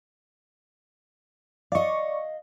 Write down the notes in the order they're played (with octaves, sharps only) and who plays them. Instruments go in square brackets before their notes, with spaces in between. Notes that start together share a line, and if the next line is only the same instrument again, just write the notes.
[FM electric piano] D5 C#6 [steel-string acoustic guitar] D#5 F5